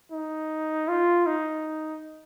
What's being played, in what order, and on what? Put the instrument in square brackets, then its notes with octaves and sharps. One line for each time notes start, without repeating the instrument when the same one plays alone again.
[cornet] D#4
F4
D#4